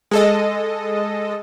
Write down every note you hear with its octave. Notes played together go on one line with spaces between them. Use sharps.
G#3 A4 D#5